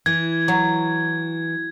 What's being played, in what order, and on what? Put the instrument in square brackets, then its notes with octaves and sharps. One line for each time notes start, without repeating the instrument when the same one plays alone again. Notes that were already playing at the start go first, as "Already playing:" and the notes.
[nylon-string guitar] E3 [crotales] G#6
[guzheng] F#3